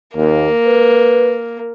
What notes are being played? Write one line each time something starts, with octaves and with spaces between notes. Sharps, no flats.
D#2 A#3
B4